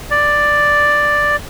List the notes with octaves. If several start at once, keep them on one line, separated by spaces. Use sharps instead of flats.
D5